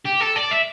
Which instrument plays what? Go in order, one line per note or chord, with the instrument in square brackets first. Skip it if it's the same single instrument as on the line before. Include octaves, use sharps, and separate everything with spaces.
[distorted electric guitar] G4
A4
D5
E5